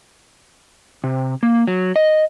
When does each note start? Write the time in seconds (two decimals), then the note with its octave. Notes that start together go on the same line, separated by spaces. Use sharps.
1.04 C3
1.43 A#3
1.68 F#3
1.96 D#5